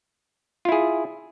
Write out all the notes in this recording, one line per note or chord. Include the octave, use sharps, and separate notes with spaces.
E4 F4 G#4